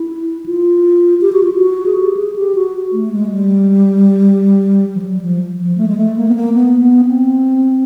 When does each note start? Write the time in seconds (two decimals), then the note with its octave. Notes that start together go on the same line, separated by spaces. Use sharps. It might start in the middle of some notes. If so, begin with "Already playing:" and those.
Already playing: E4
0.46 F4
1.21 G4
1.32 F#4
1.43 F4
1.55 F#4
1.86 G#4
1.98 G4
2.17 G#4
2.36 G4
2.55 F#4
2.92 A3
3.12 G#3
3.31 G3
4.95 F3
5.02 F#3
5.21 F3
5.59 F3
5.78 A3
5.88 G#3
5.97 A3
6.16 A#3
6.29 B3
6.35 A#3
6.54 B3
6.80 B3
7.05 C4